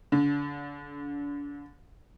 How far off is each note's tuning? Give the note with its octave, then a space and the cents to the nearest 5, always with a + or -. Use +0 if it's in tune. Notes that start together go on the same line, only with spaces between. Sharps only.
D3 -35